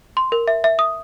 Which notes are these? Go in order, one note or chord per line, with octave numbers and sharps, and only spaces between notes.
C6
A#4
E5
E5
D#6